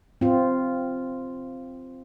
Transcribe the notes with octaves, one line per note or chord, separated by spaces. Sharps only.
C4 F4